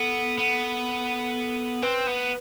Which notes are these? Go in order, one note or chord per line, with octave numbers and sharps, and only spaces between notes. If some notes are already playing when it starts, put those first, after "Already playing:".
Already playing: B3 A4
B3
C4 B4
B3